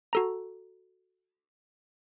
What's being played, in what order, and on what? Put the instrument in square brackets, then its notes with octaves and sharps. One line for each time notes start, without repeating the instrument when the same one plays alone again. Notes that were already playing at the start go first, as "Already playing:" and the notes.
[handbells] F#4 A4 A#5